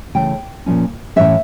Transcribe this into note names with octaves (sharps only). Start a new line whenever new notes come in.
C#3 E3 A3 C#4 G5
A#2 F3 C#4
A2 E3 A#3 C#4 E5